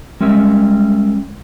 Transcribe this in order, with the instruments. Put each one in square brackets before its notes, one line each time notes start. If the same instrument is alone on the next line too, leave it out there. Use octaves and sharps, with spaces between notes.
[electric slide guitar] G3 G#3 C#4 A#4 E5